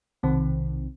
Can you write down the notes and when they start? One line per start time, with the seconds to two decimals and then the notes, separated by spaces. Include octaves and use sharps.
0.23 B1 C3 D#3 C4